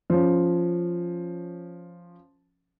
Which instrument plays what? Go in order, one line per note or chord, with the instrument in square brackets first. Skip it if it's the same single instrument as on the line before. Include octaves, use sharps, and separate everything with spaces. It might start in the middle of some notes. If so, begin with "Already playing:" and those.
[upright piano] F3 C#4